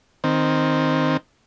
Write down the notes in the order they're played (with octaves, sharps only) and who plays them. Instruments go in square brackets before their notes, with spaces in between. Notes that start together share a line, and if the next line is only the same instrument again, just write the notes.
[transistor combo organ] D#3 C4